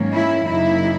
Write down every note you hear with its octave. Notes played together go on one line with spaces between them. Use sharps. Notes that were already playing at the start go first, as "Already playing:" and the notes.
Already playing: G#2 D#3 F#3 A#3 C#4
E4
F#2 C#3 F#3 A#3 D#4 E4